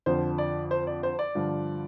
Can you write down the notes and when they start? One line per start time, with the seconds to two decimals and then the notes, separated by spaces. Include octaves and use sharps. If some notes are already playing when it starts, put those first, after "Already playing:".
0.06 F2 D3 F3 C5
0.38 D5
0.71 C5
0.87 D5
1.03 C5
1.19 D5
1.35 G2 D3 F3